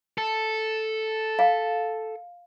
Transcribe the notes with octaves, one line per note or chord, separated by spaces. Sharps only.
A4
F5